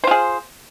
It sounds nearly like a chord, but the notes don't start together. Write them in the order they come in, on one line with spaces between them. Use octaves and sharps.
C5 F4 G#4